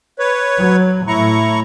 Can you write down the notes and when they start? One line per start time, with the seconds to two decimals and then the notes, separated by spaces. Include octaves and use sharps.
0.19 B4 C#5
0.58 F#3
1.08 A2 E4 A#5 C#6